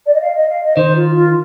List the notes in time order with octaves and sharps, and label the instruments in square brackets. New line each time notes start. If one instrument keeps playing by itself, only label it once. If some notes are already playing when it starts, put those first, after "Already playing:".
[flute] D5
D#5
F5
D#5
F5
D#5
[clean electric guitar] D#3 [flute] C5
[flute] F4
F4